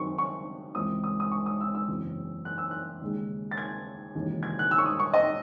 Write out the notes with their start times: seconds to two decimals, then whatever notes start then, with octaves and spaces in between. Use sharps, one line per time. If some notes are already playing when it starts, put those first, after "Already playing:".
Already playing: F#2 D#3 F#3 C4 C#6
0.18 C#6
0.75 C#2 C#3 E3 C4 E4 D#6
1.04 D#6
1.20 D#6
1.32 C#6
1.46 D#6
1.61 E6
1.75 E6
1.88 F#1 E2 C#3 F#3 C4
2.45 F#6
2.58 E6
2.71 F#6
3.02 D#2 C#3 G#3
3.51 A6
3.57 G#6
4.15 E1 D#2 C#3 E3
4.43 G#6
4.59 F#6
4.71 E6
4.78 C#6
4.86 D#6
4.99 C#6
5.14 D#5